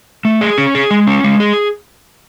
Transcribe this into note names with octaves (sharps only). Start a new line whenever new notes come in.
A3
G#4
C#4
G#4
G#3
C#4
G#3
G#4